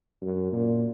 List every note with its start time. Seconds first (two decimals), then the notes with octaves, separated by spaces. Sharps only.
0.21 F#2
0.52 A#2